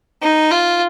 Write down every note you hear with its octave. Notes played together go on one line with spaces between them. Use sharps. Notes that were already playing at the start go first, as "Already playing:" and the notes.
D#4
F4